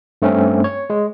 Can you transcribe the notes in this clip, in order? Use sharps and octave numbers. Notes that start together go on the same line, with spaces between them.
G2 A3 C4 C#4
C#5
G#3